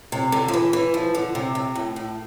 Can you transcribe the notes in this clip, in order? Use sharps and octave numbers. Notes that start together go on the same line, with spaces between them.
C3
D3
F3
E3
E3
F3
D3
C3
C3
A2
A2